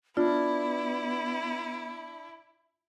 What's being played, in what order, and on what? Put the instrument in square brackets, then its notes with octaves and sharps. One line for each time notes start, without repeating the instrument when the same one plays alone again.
[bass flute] B3 [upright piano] D4 [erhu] E4 [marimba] F4